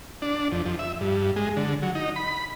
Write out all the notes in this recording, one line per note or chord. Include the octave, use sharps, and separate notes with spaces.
D4
F2
F2
E5
G2
G#3
D3
F#3
D#4
B5